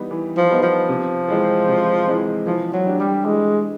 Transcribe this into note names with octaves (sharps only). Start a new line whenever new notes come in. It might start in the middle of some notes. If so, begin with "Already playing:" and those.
Already playing: E3 G3 B3 D#4
E3
F3
G3 B3 D#4
F3
C3
E3 G#3 C4
C3
E3 G#3 C4
E3 F3
F#3
A3 D4 G4
G3
E3 G#3